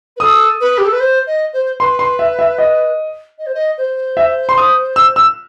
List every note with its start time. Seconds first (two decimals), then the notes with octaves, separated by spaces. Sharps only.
0.16 B4
0.20 A4 D#6
0.60 B4
0.78 G4
0.85 A4
0.92 B4
1.00 C5
1.26 D#5
1.53 C5
1.80 B4 C6
1.99 C6
2.19 E5
2.39 E5
2.58 D#5
3.38 D#5
3.46 C5
3.54 D#5
3.77 C5
4.17 E5
4.49 C6
4.58 D#6
4.96 E6
5.16 E6